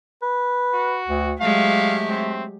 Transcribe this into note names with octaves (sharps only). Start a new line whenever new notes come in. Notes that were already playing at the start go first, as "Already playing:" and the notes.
B4
F#4
D2
F#3 G#3 A3 G4 F5
C4